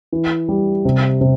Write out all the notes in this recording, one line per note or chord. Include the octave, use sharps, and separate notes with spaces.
E3
G3
C3
C3